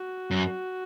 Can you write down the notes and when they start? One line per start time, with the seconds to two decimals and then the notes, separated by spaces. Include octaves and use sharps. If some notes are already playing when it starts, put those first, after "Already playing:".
Already playing: F#4
0.31 F#2